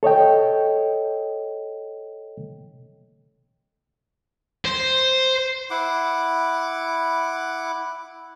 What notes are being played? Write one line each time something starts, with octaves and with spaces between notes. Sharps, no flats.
A4 C#5 D#5 G5
C5
E4 F#5 D6